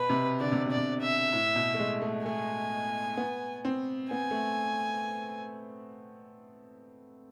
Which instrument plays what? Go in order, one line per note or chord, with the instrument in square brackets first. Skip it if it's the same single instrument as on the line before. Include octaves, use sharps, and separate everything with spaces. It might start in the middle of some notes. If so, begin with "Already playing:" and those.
Already playing: [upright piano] B2 [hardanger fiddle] B4
[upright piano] C3
[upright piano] D3 [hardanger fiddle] D5
[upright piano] C3
B2
[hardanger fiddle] D5
[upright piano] C3
[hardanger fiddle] E5
[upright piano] A2
B2
A3
G#3
A3
[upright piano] A3 [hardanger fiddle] G#5
[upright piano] B3
C4
[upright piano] B3 [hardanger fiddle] G#5
[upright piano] A3